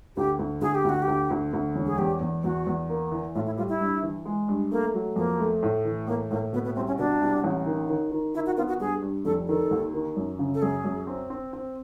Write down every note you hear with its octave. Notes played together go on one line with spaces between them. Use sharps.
D2 G4
D2
D2 G#4
G4
D2 F#4
G4
D2
D2
D2
E1
G#4
E2 G4
E2
E2 F#4
E2
A#3
E3
A2 F4
E4
G3 F4
E4
G2
E3
G#3
G2
A3 A#3
F#3
F2 A#3
A3
A2
E3
A2 A#3
A2 A#3
B2 B3
B3
C2 C4
C#4
B2 D4
C2
A1
D#3
D#3
D#3
D#3 E4
F#4
B3 F4
F#4
G2 G#4
G2
F1 A4
D#3 A4
D#2
D#3
F#2
C#3
A4
F#2 G#4
F#2
C4
C4
C4